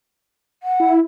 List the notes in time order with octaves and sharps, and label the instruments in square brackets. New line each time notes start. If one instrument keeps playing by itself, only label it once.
[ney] F#5
[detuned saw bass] E4